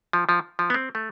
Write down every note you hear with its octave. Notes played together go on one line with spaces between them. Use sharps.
F3
F3
F3
B3
C4
A3